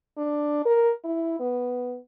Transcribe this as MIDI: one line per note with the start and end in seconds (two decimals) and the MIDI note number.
0.18 0.62 62
0.65 0.93 70
1.04 1.37 64
1.40 1.98 59